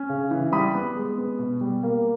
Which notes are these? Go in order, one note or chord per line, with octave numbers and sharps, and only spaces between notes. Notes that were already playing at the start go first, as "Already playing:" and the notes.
Already playing: C#4
C#3
E3
G3 B5 D#6
B3
G#3
B3
B2
G3
A#3